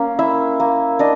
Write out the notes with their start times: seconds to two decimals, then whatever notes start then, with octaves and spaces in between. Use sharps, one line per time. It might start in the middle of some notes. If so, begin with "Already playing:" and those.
Already playing: A#3 C#4
0.19 E4 E5
0.60 A#3
0.99 D4 D#5